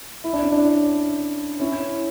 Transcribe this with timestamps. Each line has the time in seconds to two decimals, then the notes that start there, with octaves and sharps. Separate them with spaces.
0.24 E4
0.33 D4
0.42 C#4
0.52 D4
1.60 C#4 E4